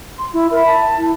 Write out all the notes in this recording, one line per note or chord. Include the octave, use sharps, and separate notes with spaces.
C6
E4
A#4 E5 B5
A5
E4